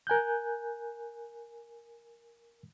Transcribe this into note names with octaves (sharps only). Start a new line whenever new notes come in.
A#4 G#5 F#6 G6